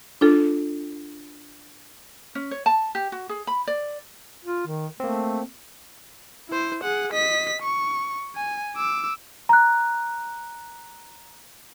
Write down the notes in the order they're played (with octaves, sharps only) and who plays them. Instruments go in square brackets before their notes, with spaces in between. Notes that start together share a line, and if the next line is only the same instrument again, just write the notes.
[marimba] D4 F4 A4
[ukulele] C#4
C#5
A5
G4
F#4
G#4
B5
D5
[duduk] F4
D#3
[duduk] A3 [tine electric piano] A#3 C4
[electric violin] E4 C5
G#4 F#5
D#5 B6
C#6
G#5
D6 E6
[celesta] A#5 F#6